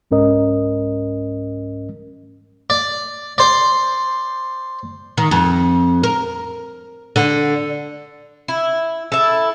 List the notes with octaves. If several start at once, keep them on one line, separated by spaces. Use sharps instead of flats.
C2 G#2 C#4 A#4 D#5
D5
C5 D5
D#3
F2
A#4
D3
E4
E4 A4